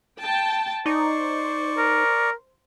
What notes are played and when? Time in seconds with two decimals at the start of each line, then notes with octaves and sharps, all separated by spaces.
0.21 G5 A5
0.86 D#4 C5 D5 C#6
1.78 A#4